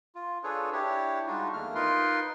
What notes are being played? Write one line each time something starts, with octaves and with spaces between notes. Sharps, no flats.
F4
D4 F4 G#4 A4 B4 C#5
D4 E4 G4 C#5
G3 G#3 D4 D#4 F4 F#4
E2 D#3 A3 A#3 F6
D#4 F4 A#4 B4 C6